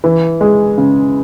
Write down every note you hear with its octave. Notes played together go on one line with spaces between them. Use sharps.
E3
G#3
C#3